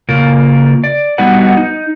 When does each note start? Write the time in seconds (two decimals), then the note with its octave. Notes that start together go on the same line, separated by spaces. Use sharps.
0.09 C#3 A#3 F4 A#4
0.84 D5
1.18 G3 B3 D#4 F#4 B4 F#5
1.57 D#4